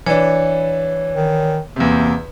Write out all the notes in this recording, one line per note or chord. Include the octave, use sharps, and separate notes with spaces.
E3 D4 C#5
D#3
E2 C3 A#3